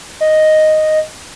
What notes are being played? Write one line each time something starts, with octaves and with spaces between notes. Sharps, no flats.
D#5